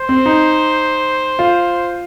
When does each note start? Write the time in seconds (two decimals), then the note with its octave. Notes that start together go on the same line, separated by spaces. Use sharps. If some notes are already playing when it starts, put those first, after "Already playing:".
Already playing: C5
0.09 C4
0.26 D#4
1.39 F4